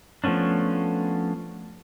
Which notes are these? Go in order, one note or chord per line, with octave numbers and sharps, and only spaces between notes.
F3 A3 B3 C#4 D4